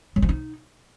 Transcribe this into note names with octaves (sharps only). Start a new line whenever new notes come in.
F#3
F3
D#4